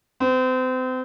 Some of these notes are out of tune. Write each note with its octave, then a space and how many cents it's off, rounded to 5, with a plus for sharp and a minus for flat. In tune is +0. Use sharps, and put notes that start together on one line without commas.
C4 -35